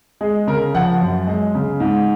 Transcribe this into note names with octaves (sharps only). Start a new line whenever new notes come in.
G#3 G#4
C#3 A#4
F3 F#5
F#2
G#3
C#3
G#2